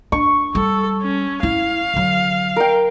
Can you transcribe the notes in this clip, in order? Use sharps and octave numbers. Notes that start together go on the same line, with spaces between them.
D4 C#6
G3 A4
C#4
E4 F5
D3 F#3
A#4 G5